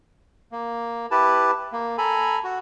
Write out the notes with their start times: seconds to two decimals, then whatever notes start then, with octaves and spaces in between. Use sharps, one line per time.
0.52 A#3
1.11 E4 G4 B4 A5
1.72 A#3
1.98 A4 G#5 A#5 B5
2.44 F#4